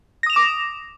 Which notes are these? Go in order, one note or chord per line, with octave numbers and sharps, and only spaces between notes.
D6 D#6 A#6 E7 F7